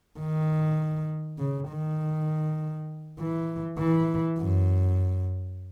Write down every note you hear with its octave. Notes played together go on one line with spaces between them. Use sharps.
D#3
C#3
D#3
E3
E3
F#2